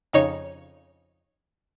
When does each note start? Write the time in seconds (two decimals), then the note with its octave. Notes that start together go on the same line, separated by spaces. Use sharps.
0.13 F2 C#3 D#4 C#5